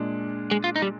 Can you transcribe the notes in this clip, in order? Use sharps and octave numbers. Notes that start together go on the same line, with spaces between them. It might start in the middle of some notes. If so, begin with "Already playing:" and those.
Already playing: A#2 G#3 D4
G#3
F4
D#4
G3